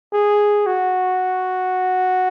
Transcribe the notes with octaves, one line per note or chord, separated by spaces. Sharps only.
G#4
F#4